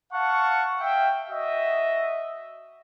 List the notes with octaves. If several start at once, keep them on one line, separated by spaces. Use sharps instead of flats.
F5 F#5 A5 C#6
E5 F5 G5
F#4 D#5 E5